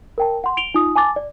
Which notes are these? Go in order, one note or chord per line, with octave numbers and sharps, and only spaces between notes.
A#4 G5 A5
F#5 C6
D7 F7 G7
D#4 F4 D#6
G#5 A5 D6 A6
D5